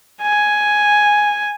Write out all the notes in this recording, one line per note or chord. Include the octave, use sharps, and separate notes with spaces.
G#5